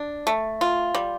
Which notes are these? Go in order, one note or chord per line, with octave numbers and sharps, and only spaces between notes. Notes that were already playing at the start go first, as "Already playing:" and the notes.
Already playing: D4
A3
F4
G3